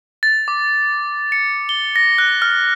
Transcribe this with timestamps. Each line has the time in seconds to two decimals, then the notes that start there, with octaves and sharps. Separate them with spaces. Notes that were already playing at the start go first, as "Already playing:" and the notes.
0.23 A6
0.48 D6
1.32 C#7
1.69 G7
1.96 A#6
2.18 F#6
2.42 F6